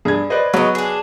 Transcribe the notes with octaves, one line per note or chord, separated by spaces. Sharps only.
G2 G#4 G#6
B4 C5 D5 D#5
C#3 F#3 B3 D#5 C#6
D4 G#4